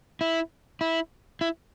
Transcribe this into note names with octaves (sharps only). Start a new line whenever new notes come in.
E4
E4
E4